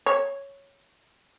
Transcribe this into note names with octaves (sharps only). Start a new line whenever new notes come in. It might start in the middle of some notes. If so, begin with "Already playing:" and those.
C#5